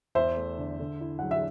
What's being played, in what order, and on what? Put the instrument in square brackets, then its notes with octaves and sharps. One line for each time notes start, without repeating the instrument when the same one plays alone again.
[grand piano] E2 [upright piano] C5 E5
[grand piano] A3
D3
D3
E4
[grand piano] F#3 [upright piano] F#5
[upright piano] E5